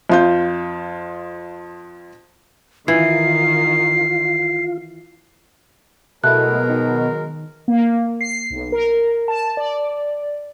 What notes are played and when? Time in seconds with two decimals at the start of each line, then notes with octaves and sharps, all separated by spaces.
0.10 F2 F4 G6
2.88 D#3 E3 F4 C7
6.24 B2 F#3 G#3 A3 E4 A#4 F#6
6.69 D#3
7.68 A#3
8.21 C7
8.50 B1
8.72 A#4
9.28 A5
9.57 D5